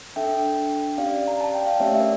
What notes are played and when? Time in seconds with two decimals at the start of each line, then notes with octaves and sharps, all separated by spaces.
0.16 D4 A4 E5 G5
0.98 C#4 G4 D5 F5
1.28 A#5
1.41 A5
1.54 G5
1.67 F5
1.80 A3 C#4 G4 C#5 E5
1.94 E5
2.00 A#4 D5